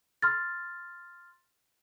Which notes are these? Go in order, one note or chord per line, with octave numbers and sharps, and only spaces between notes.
C6 F6 A6